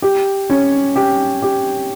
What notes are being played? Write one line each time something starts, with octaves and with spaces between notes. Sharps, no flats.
G4
C#4
G4
G4